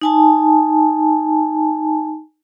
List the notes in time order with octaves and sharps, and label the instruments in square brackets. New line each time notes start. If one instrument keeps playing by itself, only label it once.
[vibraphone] D#4 G#5 A5